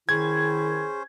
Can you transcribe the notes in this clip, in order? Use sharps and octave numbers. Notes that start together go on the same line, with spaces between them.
D#3 C#4 E4 G#4 C5 G#6